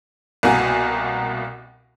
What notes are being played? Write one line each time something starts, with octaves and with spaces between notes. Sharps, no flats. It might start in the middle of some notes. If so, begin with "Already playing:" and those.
C2 B2 A#3 F#4 G#5